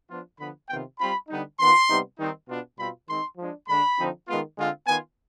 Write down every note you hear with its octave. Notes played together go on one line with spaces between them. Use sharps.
F3 B3 D4 F4
D3 F3 B3 B5
C3 D#3 B3 F4 G5
G3 C4 F4 B5
D3 G3 B3 D#4
D#3 B3 F4 C6
C3 G3 B3 D#4
D#3 G3 C4 D#4
B2 B3 D4 F4
B2 G3 C4 F4 B5
D#3 G#3 C4 D#4 C6
F3 G#3 D4
D3 G#3 D4 B5
D3 F3 C4 D#4
D#3 G#3 B3 F4
D3 G#3 C4 F4
D#3 B3 F4 G#5